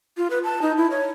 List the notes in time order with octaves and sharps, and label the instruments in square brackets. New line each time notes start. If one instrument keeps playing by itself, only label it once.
[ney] F4
B4
A5
D#4
E4
C#5